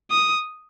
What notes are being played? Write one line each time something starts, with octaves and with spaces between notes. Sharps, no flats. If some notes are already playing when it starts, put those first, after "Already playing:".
D#6